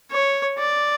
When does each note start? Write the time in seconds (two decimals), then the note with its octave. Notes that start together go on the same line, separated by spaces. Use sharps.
0.11 C#5
0.58 D5